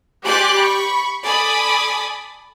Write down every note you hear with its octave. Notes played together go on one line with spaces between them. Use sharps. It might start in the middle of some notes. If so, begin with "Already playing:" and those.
G4 D5 G#5 C6 F#6
B5 C#6
A4 D5 G#5 B5 D#6